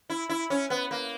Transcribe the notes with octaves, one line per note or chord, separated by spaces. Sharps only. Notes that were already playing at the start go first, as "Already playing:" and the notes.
E4
E4
C#4
B3
A#3